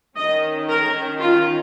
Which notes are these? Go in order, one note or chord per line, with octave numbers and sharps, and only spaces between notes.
D#3 C#4 D#5
A#4
F4